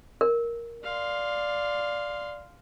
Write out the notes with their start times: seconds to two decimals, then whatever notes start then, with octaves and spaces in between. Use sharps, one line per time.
0.21 A#4
0.84 D5 F5 C6